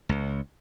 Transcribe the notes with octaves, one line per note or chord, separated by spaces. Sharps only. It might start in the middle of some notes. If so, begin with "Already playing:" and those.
C#2